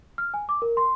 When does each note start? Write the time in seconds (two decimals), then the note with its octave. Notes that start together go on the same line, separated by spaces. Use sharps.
0.18 F6
0.34 G#5
0.49 D6
0.62 A#4
0.77 C6